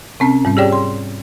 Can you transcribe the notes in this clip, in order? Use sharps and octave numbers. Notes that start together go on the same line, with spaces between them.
C3 C4 C#4
G#2 G3 C#4
G4 G#4 C#5 D5 G5
C6